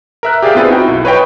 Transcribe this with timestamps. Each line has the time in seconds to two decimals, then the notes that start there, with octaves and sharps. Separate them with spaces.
0.23 A#4 E5 F#6
0.42 G4 G#4 D5 E5 F5 G5
0.55 B3 C4 F4 G#4 B4
0.68 D#4 E4 F#4 A#4 G5
0.88 B1
1.05 B4 C#5 D#5 G5 B5